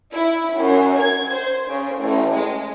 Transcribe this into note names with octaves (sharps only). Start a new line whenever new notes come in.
E4
F#2
G#6
C5
C#3
A1
G#3